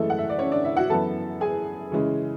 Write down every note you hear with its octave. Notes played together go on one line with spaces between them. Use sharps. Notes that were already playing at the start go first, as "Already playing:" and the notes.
Already playing: F#2 E3 G#3 A3 A4
F#5
E5
D5
C#4 C#5
D4 D5
E4 E5
F#4 F#5
F#2 E3 B3 A4 A5
G#4 G#5
C#3 E3 G#3 C#4